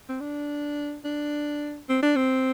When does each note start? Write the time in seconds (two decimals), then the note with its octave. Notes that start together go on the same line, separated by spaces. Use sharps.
0.09 C4
0.21 D4
1.05 D4
1.89 C4
2.03 D4
2.16 C4